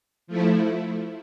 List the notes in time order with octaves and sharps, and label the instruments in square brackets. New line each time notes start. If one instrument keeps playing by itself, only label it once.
[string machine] F3 A3 E4